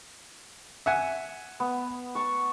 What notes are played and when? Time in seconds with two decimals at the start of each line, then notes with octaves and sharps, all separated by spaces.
0.86 E5 F#5 G#5
1.60 B3
2.15 A5 C#6